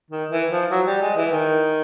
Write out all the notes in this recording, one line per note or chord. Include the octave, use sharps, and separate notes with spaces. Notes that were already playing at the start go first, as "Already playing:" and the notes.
D#3
E3
F3
F#3
G3
G#3
E3
D#3